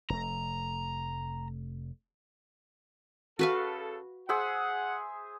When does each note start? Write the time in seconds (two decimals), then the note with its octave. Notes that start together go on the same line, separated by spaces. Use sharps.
0.10 F1 A3 A#5
3.39 C#3 F#4 A4 B4 F5
4.29 G#4 C5 E5 F#5